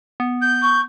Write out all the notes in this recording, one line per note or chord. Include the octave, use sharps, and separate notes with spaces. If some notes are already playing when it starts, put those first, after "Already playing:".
B3
G6
C#6